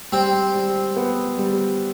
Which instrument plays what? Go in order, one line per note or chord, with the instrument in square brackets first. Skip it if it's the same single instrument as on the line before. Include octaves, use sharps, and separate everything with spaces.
[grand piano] G3 [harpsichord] C4
[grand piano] G3
B3
G3